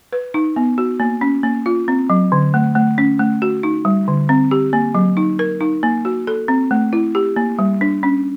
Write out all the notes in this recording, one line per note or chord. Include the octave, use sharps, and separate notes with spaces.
B4
D#4
B3
F#4
A#3
C#4
A#3
F4
C4
F#3
D3
A3
A3
C#4
A3
F#4
D#4
G3
D3
C4
G4
A#3
F#3
D#4
A#4
D#4
A#3
F#4
A4
C4
A3
E4
G4
A#3
G3
D4
C#4